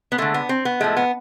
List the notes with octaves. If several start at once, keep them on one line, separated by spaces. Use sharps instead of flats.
B3
D3 G#3 A3
B3
C4
B3
A2 F3 G#3 A3
B3